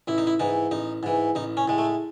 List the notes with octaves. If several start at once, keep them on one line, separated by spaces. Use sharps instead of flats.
A1 E4
D#4
E4
G#2 E3 D#4
A1 D#4
G#2 E3
A1 D#4
C#4
A2 G#3
A3